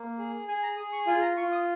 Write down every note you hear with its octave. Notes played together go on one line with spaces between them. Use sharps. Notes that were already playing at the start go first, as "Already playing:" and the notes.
Already playing: A#3
G#4
G#4 G#5
A#5
G#4 D#6
C#6
F4 G#5
A#5
F4 C#6
D#6